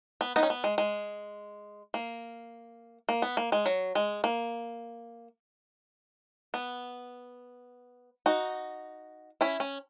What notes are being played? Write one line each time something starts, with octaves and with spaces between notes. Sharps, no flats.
B3
B3 D#4
C#4
B3
G#3
G#3
A#3
A#3
B3
A#3
G#3
F#3
G#3
A#3
B3
D#4 F#4
C#4 E4
C#4